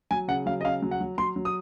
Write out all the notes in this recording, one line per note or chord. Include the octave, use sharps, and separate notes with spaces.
F#3 G#5
C#3 F#5
F#3 F5
D#5
C#3 F5
F#3
F#5
F#3
F#3 C6
F#3
D#6